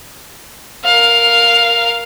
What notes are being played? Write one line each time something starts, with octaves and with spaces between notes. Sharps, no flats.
A#4 F5